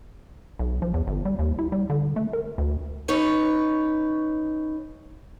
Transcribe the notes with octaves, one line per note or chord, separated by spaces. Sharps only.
B1
F3
E2
G1
G3
D#2
E4
G3
D3
A3
A#4
D2
C#4 D#4 B4 C#5